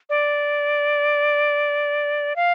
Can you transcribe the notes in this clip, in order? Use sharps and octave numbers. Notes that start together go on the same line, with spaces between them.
D5
F5